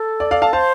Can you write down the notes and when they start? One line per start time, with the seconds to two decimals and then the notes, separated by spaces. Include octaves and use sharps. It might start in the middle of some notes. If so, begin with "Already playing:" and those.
Already playing: A4
0.20 D5
0.31 D5 F5
0.42 F5 A5
0.53 C5 F5 A5